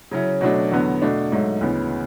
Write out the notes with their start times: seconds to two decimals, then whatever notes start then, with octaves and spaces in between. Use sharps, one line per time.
0.11 C#3 F#3 C#4 E4
0.41 B2 F#3 A3 D4
0.71 E2 D3 F#3 B3
1.02 B2 A3 D4
1.32 G#2 F#3 A3
1.61 D2 C#3 E3 B3